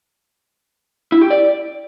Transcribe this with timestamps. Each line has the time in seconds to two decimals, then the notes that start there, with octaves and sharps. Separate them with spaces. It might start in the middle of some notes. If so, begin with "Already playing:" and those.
1.12 E4
1.21 G4
1.31 D5